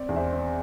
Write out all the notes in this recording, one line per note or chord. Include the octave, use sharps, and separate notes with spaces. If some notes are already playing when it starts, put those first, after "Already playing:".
Already playing: C4 D5
E2
C5 E5
C4